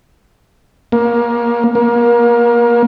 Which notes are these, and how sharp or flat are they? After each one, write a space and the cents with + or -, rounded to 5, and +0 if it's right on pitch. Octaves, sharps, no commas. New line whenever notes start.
A#3 +25
A#3 +30